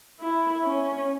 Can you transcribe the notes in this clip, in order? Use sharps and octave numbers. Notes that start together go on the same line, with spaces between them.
E4
C#4